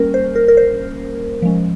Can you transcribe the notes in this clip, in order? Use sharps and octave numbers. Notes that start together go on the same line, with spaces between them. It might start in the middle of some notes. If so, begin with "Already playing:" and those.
Already playing: G3 A#3 C#4 A#4
C5
A#4
A#4
C5
F3 G#3 C#4